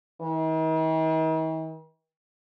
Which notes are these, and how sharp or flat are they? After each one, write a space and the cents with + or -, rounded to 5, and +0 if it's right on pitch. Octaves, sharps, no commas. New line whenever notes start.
D#3 +45